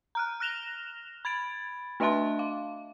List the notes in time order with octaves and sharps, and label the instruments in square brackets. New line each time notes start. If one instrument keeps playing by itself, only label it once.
[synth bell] A#5 F6 F#6
F6 F#6 A#6 E7 F7 G7
B5 G#6 A6 D7
A3 D4 D#5 E5 A5 C6
F5